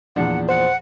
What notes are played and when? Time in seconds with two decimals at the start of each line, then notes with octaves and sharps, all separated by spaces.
0.16 E2 A#2 F3 D4 F#5
0.49 C5 F#5